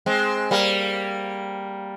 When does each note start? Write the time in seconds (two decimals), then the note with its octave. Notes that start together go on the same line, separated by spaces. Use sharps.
0.06 G#3 C4
0.51 G3 A#3